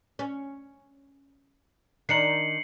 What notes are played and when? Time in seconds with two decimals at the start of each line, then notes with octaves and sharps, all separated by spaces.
0.19 C#4
2.09 D#3 D4 D#4 C7 C#7 F#7